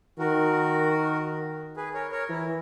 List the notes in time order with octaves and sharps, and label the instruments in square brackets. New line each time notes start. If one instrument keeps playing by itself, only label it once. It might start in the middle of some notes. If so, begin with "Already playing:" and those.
[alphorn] D#3 [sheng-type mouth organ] F#4 A#4
[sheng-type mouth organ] G#4 B4
A#4 C#5
A#4 C#5
[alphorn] E3 [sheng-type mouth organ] E4